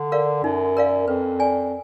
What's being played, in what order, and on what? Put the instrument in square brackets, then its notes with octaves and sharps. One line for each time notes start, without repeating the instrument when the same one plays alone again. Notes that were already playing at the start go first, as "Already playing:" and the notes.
Already playing: [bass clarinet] D3
[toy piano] A#4 D5 F5
[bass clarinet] F#2 [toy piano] D#4
[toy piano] A#4 D5 F5
[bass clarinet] F2 [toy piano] B4
[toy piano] D5 G#5